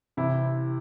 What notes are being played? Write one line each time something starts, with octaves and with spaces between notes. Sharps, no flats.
C3 E3 E4